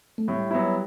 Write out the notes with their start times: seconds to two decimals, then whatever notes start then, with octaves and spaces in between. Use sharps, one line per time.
0.18 A3
0.28 A2 G3
0.51 F#3 B3 E4